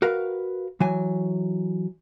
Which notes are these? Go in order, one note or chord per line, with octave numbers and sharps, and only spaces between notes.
F#4 A#4 B4 F5
E3 F#3 G#5